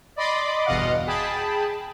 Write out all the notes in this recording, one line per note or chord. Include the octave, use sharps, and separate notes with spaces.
D5 D#5 B5 C6 D6
G1 E2 B2 D#5 F5 F#5
G#4 G5 A5 B5